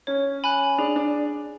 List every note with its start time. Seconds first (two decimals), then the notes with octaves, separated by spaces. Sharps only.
0.07 C#4 C#5
0.44 G#5 B5 F#6
0.78 D4 G#4
0.96 D4